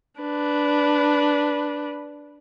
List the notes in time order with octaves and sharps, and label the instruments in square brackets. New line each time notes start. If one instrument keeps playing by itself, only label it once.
[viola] D4 B4